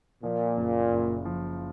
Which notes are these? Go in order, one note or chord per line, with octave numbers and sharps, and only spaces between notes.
A#2 F3
F#1
F#1
F3